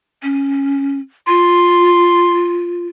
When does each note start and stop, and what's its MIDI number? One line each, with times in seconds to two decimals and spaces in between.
0.23 0.98 61
1.28 2.86 65
1.28 2.58 84